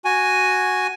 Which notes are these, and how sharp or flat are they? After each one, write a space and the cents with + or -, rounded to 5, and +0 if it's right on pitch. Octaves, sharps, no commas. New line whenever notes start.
F#4 +0 G#5 +0